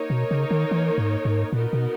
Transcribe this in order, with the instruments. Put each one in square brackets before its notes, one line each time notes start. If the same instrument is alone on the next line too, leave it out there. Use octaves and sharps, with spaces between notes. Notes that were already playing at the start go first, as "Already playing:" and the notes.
Already playing: [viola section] A#3 D#4 A#4 C#5
[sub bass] B2
C#3
D#3
E3
G#2
G#2
[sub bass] A#2 [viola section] B3 D#4 F#4 A#4
[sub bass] B2